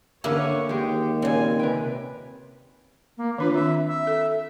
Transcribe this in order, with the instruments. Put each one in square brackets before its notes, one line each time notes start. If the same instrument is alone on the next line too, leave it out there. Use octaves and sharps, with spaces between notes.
[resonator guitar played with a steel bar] D3 B3 C#4 [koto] A#3 E4 [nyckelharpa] C#5 C#6
[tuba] D#2 [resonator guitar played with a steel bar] G#3 G4 [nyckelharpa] G5
[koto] A#2 C#3 [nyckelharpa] C4 G#5
[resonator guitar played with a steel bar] C3 G5 [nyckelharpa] B4
[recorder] A#3
[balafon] D#3 D4 F4 [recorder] B4
[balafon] C4 [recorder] E5
[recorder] E5
[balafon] A4